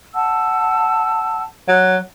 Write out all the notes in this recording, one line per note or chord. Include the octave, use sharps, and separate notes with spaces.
F#5 A5 E6
F#3